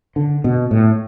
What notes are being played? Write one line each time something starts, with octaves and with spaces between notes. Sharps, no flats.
D3
B2
A2